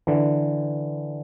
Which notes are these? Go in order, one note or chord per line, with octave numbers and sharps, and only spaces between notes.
D3 E3